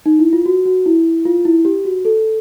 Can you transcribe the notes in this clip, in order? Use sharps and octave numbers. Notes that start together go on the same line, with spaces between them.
D#4
E4
F4
F#4
F#4
E4
F4
E4
G4
F#4
A4